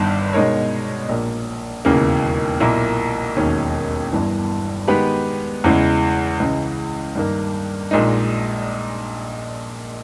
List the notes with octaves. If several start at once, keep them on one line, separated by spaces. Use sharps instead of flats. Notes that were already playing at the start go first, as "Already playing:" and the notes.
Already playing: G1 G2 D#3
B2 G#3 D#4 A#4 C#5
A#1 A#2 A#3
E1 D#2 C#3 E3 A#3
B1 A#2 A#3 E4
E1 D#2 D#3 A#3 C#4
G1 G2 E3
D#3 G#3 B3 G4 B4
E2 C#3 E3 G#3
C#2 C#3 E3 G#3
G2 D#3 A#3
A#1 A#2 G#3 D#4